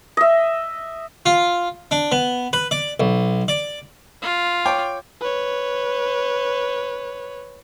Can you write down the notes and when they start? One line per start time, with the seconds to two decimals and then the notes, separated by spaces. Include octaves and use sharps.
0.17 D#5 E5
1.26 F4
1.91 D4
2.12 B3
2.53 B4
2.71 D5
3.00 B1
3.48 D5
4.22 F4
4.66 C#5 G5 D6
5.21 B4 C#5